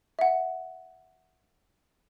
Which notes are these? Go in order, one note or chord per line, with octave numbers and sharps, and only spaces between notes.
E5 F#5